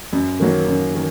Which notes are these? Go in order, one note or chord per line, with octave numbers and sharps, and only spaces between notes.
F#2
D#3 F#3 A#3
F#2
D#3